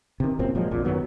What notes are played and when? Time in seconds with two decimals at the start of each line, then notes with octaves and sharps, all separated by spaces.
0.20 C3 D#3
0.39 F#1 F#2 A#2 C4
0.55 A#2 F3 F#3 G#3
0.71 A#1 F2 A#2
0.85 F#2 D#3 F#3 B3